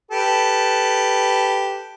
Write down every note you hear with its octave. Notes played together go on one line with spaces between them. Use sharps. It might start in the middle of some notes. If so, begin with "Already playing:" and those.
G4 A4 B4